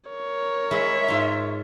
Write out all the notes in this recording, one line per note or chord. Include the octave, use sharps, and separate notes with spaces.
A#4 C#5
G#3 E4 E5
G#2 F4